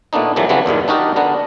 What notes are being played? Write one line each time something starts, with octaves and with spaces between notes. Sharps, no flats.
A#2 A3 B3 D4 D#4
C2 F2 C3 D#3 E3 F#3
C#3 E3 F#3 B3 C4 D4
E2 G2 A#2 D#3
D4 D#4 F#4 G4 A#4 D5
D3 B3 D4 F#5 A#5